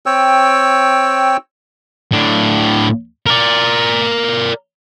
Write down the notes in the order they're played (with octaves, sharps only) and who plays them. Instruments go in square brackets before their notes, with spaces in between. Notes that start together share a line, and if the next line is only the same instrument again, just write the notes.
[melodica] C4 C#5 G5 E6
[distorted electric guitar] A2 D4
A#4 D5